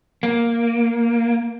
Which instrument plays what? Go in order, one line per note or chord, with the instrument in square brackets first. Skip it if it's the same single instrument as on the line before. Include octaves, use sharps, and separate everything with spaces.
[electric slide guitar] A#3